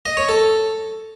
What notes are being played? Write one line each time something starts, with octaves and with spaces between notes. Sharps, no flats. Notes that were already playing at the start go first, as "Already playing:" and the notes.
D#5
C#5
A4